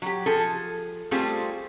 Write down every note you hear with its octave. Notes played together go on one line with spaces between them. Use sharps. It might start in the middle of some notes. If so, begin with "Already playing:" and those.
F#3 G4
F3 G#4 A4
G3 A3 C4 F4 G4 G#4